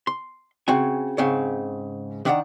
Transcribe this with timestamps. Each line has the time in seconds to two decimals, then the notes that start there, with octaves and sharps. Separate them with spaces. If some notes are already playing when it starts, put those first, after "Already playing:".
0.07 C6
0.68 C#3 C4 F#4 G#5
1.18 G#2 C#3 C4 C#5
2.25 D#3 D4 D5 E5 F#5 A#5